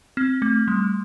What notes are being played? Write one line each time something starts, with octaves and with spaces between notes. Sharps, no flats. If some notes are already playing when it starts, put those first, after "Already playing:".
C4
A3
G3